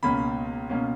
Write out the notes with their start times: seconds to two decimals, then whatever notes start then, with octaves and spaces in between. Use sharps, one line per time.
0.03 C#2 B2 A#3 C#4 B5
0.70 B2 A#3 C#4